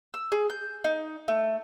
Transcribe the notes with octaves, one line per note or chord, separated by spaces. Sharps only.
E6
G#4
G6
D#4
A3